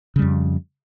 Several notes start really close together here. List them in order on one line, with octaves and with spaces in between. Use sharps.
C#3 G3 F2